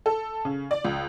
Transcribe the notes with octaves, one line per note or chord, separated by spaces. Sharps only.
A4
C#3
D5
C#2